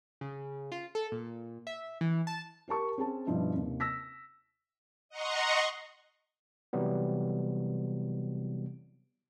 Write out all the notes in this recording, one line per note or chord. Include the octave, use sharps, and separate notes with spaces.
C#3
F4
A4
A#2
E5
E3
A5
G4 A#4 A5 C#6
C4 C#4 G#4 A5
G2 B2 F3 D4 E4
D#2 C3
E6 A#6 B6
D#5 F#5 A#5 C6 C#6
C3 E3 F#3 G3 B3